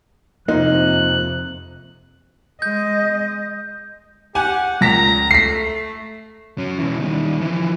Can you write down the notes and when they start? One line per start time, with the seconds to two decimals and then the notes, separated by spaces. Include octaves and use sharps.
0.48 F2 C3 A#3 D#4 F4 F#6
2.62 G#3 D#5 G6
4.35 G4 F#5 G#5
4.81 C#2 A#2 A#5 A#6 B6
5.31 A3 B6 C7
6.58 F#3 C#4
6.78 B2 E3
6.99 D#3 G3
7.41 E3 F3